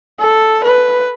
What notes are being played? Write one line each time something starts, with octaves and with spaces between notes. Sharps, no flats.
A4
B4